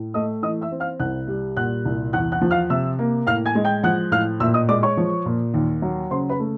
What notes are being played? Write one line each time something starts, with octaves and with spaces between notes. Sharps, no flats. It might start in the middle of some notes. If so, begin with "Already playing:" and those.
Already playing: A2
A3 D#5 D#6
E3 D#5 D#6
E5 E6
C4
F5 F6
C2 F#5 F#6
G3
A#2 F#5 F#6
C2
E2 F#5 F#6
F#5 F#6
F3
F5 F6
C3 E5 E6
A#3
A2 F5 F6
G#5 G#6
G#3
G5 G6
F3 F#5 F#6
A2 F5 F6
A#2 E5 E6
D#5 D#6
G#3 D5 D6
C#5 C#6
F3
A#2
D#2
F#3
C#3 C5 C6
B4 B5
A3